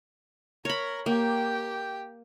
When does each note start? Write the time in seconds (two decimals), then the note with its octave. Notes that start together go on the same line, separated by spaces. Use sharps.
0.65 A#4 C#5 A#5 B5
1.06 A#3 G4 G5